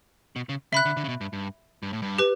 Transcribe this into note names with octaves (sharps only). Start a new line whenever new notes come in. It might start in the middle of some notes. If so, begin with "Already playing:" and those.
B2
C#3
C#3 E5 B5 F#6
D3
D3
C#3
B2
G2
G2
G2
A2
G2
G4 B4